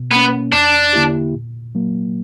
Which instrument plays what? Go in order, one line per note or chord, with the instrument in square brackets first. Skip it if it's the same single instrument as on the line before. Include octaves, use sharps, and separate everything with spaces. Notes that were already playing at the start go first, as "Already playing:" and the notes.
Already playing: [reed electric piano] B2
[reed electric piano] A#3 C#4 [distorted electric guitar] B3
[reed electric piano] E2 [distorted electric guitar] D4
[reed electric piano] D3 A#3 E4 G4
A#2
F#3 A#3